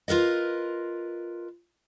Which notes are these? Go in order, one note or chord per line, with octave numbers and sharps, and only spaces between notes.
F4 A#4 B4 D#5